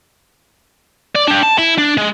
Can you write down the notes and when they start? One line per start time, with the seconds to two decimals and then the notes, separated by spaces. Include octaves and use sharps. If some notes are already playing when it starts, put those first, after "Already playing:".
1.15 D5
1.28 D4 G4
1.43 A5
1.58 E4
1.78 D4
1.97 G#3